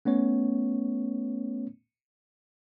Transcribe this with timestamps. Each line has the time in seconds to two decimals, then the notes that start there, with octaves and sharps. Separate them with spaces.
0.05 A3 B3 C#4 C#5